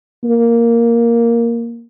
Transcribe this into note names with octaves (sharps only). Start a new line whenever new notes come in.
A#3